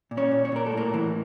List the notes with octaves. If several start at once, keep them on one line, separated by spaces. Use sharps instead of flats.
A#2
C#4 C#5
A#2
C#5
A#2 A#4
A4
A2
A#3 A#4
E3